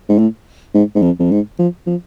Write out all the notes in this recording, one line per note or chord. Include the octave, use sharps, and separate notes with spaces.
G#2
A2
G#2
G#2
F2
F2
G#2
F3
F3